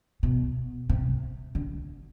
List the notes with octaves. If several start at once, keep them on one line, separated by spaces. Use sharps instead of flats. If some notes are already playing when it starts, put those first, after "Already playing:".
B2
C3
D3